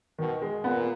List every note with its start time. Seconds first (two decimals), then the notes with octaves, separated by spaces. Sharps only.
0.18 B2 D#3
0.42 G#3
0.63 A#2 B3